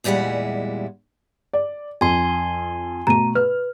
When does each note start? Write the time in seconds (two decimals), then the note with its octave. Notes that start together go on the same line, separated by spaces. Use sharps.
0.04 E2 A#2 G3 G#3 E4 F#5
1.53 D5
2.01 F2 G#5 C6
3.07 B2 A3 A#5 D#7
3.35 B4 F6